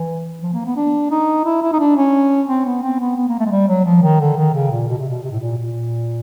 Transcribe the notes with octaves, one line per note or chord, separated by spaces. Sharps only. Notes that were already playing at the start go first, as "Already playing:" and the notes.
Already playing: E3
F3
A#3
B3
D4
D#4
E4
E4
D#4
D4
C#4
C4
B3
C4
B3
B3
A#3
A3
G#3
G3
F#3
F3
D#3
D3
D#3
C#3
A#2
B2
C3
B2
C3
A2
A#2
A#2